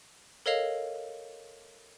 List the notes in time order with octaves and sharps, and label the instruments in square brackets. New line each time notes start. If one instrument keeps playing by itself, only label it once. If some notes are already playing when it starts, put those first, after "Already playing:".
[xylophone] A4 A#4 C#5 D#5 F5 F7